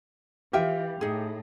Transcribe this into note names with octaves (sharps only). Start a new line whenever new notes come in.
E3 F4 G4 E5 F5 G5
A2 D#4 G#4